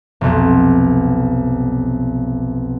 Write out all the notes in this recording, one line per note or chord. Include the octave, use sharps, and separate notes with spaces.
F1 B1